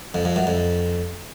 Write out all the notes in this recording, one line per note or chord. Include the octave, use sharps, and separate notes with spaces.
F2
F2
F#2
F2